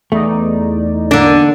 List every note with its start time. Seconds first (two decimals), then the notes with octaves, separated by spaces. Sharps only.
0.12 E2 A3 D#4 D5
1.11 D3 A#3 D4